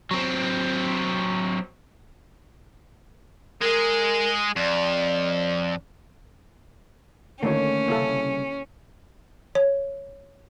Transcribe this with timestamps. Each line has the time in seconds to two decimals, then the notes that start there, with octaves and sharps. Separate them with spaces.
0.11 F#3 C4
3.62 G#3 G#4 A#4
4.56 F2 D5
7.43 D3 D#3 A3 A#3 C#4 C#5
7.88 C2 C#3 A#3 E4 A4
9.55 C#5